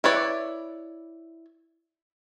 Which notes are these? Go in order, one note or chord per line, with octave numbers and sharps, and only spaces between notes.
E4 B4 C#5 D5